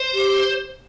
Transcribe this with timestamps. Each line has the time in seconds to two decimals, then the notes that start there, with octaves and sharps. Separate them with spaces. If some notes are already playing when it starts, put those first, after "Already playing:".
Already playing: C5
0.13 G4